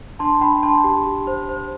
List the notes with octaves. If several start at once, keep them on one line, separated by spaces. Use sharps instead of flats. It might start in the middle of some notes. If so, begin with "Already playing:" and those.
D4 A5 C6
D4 G5 B5
D4 A5 C6
G4
G4
C5
C5